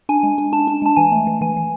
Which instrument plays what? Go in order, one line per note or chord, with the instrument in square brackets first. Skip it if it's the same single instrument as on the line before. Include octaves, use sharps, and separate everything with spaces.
[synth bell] D4 G#5
G#3
D4
D4 A5
D4
G#3 A5
E3 G#5
A3
E3
E3 G#5
E3